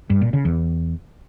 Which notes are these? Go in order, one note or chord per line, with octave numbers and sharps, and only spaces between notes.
G2
A#2
C#3
E2